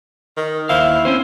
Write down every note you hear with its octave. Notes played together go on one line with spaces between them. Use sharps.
D#3
D#2 E4 C5 F5
C4 C#4 C5